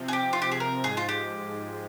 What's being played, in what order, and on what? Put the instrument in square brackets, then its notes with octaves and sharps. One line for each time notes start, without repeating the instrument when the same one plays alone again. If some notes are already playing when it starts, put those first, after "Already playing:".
Already playing: [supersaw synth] C3 F3 C4
[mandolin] G#4
G4
F4
G4
G#4
A#4
[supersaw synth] G#2 F3 G#3 [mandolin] G#4
[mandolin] F4
G4